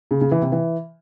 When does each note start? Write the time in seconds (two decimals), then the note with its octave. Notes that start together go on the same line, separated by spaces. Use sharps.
0.11 C#3
0.21 C#3
0.31 E3
0.42 C3
0.52 E3